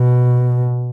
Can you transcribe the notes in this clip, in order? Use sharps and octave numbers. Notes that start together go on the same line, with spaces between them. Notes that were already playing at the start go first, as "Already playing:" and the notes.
Already playing: B2